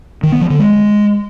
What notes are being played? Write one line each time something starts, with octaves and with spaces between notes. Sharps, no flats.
D#3
B3
F3
D3
G#3